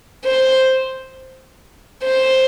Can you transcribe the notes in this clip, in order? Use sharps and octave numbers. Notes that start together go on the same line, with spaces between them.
C5
C5